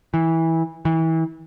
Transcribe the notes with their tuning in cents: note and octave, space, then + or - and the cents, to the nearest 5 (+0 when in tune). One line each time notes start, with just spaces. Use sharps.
E3 -15
E3 -30